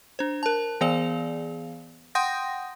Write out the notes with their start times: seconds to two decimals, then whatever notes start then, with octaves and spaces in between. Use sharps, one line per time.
0.19 D4 C5
0.43 A#4 A5
0.81 E3 B3 G#4 D5 F5 F7
2.15 F#5 G5 C6 D#6 G6 A#6